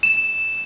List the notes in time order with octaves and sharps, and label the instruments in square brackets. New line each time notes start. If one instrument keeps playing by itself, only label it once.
[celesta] E7